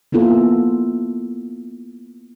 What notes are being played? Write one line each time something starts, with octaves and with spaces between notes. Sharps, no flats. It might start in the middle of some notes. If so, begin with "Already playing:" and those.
A#3 B3 E4 F4 A4